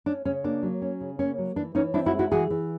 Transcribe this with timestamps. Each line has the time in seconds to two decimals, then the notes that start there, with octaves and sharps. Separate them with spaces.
0.06 C#4 D4
0.25 C#3 C#4
0.44 A#3 D4
0.63 F#3
0.82 C#4
1.01 C#3
1.19 A#3 C#4
1.38 F#3
1.56 E3 D4
1.75 E3 C#4 D#4
1.94 C4 D4 E4
2.06 E4 F#4
2.13 G#3
2.19 E4 F#4
2.32 E3 F#4 G#4
2.50 E3